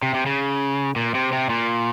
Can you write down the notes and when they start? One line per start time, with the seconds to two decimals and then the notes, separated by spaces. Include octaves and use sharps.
0.03 C3
0.14 C3
0.26 C#3
0.96 A#2
1.15 C3
1.32 C3
1.50 A#2